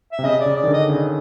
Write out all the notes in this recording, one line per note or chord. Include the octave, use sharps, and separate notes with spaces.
E5
C3
C#3 D#5
D5
C#3
D5
D#3
D3
D#5
C#3